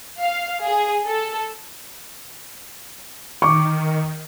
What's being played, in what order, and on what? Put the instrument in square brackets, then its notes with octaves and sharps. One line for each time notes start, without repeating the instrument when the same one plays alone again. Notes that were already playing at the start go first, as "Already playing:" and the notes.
[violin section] F5
G#4
A4
[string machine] D#3 [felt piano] C#6 D6